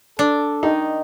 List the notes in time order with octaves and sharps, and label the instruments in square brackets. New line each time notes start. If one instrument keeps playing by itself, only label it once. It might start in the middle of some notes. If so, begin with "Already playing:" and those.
[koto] D4 [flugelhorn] A4
[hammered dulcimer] D#3 [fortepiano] D#4